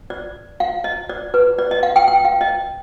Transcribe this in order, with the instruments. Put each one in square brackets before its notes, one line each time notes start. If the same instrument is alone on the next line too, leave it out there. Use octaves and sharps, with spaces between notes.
[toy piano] D5
F5
D#5
D5
B4
D5
D#5
F5
G5
G5
F5
D#5